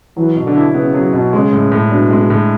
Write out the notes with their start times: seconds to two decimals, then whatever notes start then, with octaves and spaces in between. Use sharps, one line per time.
0.17 E3 F#3
0.36 B2
0.46 D3
0.56 E4
0.74 C#3 B3
0.94 F#3
1.13 B2
1.33 C#3 G#3
1.53 A2
1.72 A2
1.91 B2 D4
2.10 G#3
2.30 A2